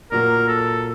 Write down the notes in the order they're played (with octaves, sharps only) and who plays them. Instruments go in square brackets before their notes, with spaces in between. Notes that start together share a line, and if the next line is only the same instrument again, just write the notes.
[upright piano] A#2 F#3 A#3 [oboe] A#4
[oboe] A4